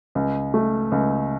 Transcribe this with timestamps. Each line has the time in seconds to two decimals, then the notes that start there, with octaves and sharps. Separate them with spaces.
0.15 C#2
0.54 A3
0.92 C#2